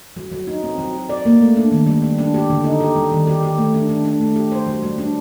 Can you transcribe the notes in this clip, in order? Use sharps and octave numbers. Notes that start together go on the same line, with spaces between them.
F#3
F#3
D#4
C4
F#3
F#3
D5
A#3
A3
D4
D#3
G3
G3
D4
G4
D3
D#4
G4
G3
D#3
G4
G4
A3
D4
D4
D4
A3
G4
C5
F#3
G3
D4